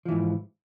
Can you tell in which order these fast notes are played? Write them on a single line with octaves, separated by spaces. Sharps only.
F3 E3 G#2